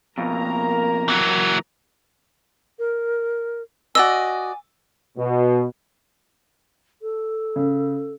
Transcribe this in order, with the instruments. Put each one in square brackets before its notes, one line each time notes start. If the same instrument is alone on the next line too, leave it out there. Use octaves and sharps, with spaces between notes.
[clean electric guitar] F2 B2 [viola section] A#3 A#4 A#5
[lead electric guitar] E3 F#3
[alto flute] A#4
[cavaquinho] F#4 D5 D#5 [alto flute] G#5 [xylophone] E6
[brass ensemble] B2
[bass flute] A4
[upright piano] C#3